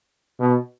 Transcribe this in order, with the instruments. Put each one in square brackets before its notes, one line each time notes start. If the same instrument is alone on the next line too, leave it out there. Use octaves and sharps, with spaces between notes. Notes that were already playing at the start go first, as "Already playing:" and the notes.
[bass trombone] B2